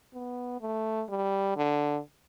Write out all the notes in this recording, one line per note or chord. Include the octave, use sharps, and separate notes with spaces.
B3
A3
G3
D3